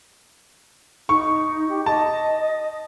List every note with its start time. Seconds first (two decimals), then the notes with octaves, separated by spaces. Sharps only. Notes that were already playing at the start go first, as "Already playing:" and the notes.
1.09 D#4 C#6
1.69 G4
1.86 D#5 A5